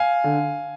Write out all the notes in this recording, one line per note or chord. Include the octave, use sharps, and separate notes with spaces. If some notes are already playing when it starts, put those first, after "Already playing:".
Already playing: F5 G#5
D3